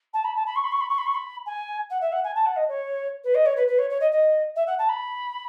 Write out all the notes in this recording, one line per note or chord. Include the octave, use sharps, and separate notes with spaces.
A5
B5
A5
B5
C#6
B5
C#6
B5
C#6
B5
C#6
B5
G#5
F#5
E5
F#5
G#5
A5
F#5
D#5
C#5
B4
D#5
C#5
B4
B4
C#5
C#5
D#5
D#5
E5
F#5
A5
B5